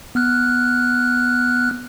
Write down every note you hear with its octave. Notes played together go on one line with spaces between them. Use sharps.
B3 F6 F#6